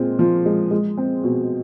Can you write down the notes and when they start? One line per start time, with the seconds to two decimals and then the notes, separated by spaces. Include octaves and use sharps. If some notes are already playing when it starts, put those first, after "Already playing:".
Already playing: A#2 G#3 C4
0.19 F3
0.46 G#3
0.71 G#3
0.98 C4
1.24 B2